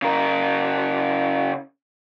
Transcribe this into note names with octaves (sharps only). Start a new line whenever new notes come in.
C#3 A#4